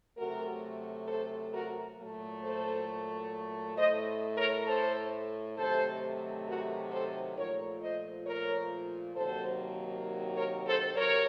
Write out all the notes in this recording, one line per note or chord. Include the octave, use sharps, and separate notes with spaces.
C3 F#3 A3 F#4 A#4
A4 C5
F#4 A#4
A#2 F#3 A3
A4 C5
A2 A3 C5 D#5
A#4 C#5
A4 C5
C3 D#3 F#3 A3 A4 C5
F#4 A#4
A4 C5
A#2 F3 A3 A#4 C#5
C5 D#5
A#4 C#5
C3 D#3 F#3 A#3 A4 C5
A#4 C#5
A4 C5
C3 F#3 A#4 C#5